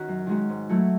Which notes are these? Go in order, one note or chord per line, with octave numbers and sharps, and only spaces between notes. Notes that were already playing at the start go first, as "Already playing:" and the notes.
Already playing: D#3 C#4 F#4
F#2
D#3 G#3 C#4 F#4
G#2
F#3 A3 E4